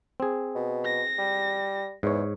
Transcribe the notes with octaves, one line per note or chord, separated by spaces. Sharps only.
C4 G#4
B2
A#6
G3
E2 G#2 C#5